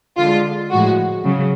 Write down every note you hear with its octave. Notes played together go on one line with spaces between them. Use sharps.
D3 G#3 F4
A2 F3 G#3 F#4
C#3 F#3